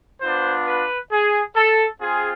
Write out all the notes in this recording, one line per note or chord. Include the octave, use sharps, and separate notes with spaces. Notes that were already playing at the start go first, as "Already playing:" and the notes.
B3 D4 F4 C5
B4
G#4
A4
C4 F4 G#4